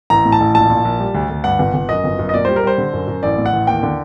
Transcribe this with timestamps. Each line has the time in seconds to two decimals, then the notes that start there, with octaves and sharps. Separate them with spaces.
0.10 A1 A#5
0.25 A2
0.32 A5
0.40 A1
0.55 A#1 A5
0.69 A#1
0.85 A#1
1.00 G3
1.14 D2
1.30 D2
1.44 G2 F#5
1.59 G1
1.74 G1
1.89 F#2 D#5
2.04 G1
2.19 F#2
2.29 D#5
2.34 A#2 D5
2.45 G3 C5
2.56 A#4
2.63 G3 C5
2.78 D3
2.93 F#2
3.08 F#2
3.23 A1 D5
3.38 A2
3.46 F#5
3.53 A1
3.67 D#2 G5
3.83 D3